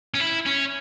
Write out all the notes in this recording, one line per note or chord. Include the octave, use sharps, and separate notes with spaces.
C#4
E4
C#4